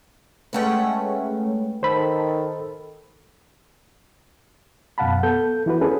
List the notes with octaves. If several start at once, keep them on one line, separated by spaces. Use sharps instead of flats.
G#3 A3 C#4 B4 F#5 G5
D#3 A4 C5 B5
F#2 B2 F5 F#5 A5 B5
B3 A4 G6
E3 E4 F#4 B4
C#4 G#4 A4 B4